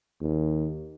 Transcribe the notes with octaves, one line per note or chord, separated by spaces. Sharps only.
D#2